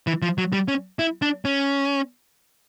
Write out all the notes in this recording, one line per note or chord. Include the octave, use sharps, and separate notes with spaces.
E3
F3
F#3
G3
C#4
E4
D4
C#4